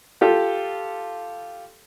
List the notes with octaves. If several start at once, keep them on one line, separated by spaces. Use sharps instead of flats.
F4 G4 A4